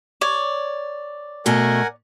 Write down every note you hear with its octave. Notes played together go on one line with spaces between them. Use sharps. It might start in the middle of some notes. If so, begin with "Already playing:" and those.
C#5 D5
B2 A3 C#4 A#4 F#5 G#5